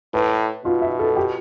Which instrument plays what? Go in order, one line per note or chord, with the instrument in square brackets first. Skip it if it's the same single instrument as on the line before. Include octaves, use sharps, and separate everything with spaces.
[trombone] A2 [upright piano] B4
[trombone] B2 [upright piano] F4
[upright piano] E5
A4
G4